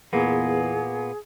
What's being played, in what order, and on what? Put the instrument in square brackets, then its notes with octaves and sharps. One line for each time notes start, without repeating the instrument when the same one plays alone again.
[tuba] E2 [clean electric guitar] A#2 A#3 B3 [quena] G#4